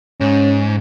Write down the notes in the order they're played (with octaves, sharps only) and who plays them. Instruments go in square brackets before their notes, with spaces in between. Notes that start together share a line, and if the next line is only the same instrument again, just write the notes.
[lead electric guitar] G#2 [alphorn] C#4